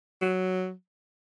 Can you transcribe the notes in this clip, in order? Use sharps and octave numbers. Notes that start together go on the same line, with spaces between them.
F#3